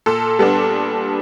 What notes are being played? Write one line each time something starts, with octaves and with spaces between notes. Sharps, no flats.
A#2 A4
G3 B3 D4 A4